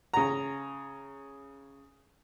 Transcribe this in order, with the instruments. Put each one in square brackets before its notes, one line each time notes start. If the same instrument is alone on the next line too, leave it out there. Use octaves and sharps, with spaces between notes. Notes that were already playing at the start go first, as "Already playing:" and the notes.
[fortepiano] C#3 A#5